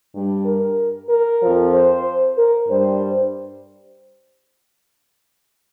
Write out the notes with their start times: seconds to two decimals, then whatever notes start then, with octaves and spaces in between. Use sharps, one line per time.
0.14 G2 G3
0.45 A#4
1.09 A#4
1.41 F2 F3
1.73 C5
2.37 A#4
2.69 G2 G3 C5